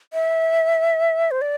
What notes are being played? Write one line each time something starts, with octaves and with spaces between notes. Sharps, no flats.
E5
C5
D5